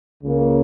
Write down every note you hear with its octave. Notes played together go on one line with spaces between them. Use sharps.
C#2 C#3 A#3